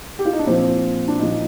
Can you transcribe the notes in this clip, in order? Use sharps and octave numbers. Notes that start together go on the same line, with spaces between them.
G4
F4
D#4
D4
A#2 F3 C4
D4
A#2 F3 D#4